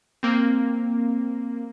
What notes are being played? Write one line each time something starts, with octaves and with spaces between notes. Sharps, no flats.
A#3 C4